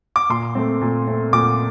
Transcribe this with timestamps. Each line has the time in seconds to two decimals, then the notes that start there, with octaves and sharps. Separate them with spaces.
0.16 D6
0.30 A#2 C6
0.55 A3 C4
0.81 A#2
1.07 A3 C4
1.33 A#2 D6